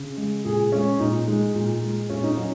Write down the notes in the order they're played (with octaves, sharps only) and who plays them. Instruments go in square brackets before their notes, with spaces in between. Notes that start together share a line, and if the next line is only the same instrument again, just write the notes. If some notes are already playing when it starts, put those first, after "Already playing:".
Already playing: [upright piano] C#3
G#3
A#2 G#4
G#3 C#4
A#2 D#4
G#3
A#2
G#3
A#2 C#4
D#4
F#3 C#4